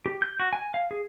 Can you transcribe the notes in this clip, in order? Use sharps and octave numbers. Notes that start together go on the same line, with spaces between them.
G4
G6
F#4
G#5
F5
G#4